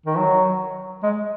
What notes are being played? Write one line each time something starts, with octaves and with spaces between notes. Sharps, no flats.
D#3
F#3
G#3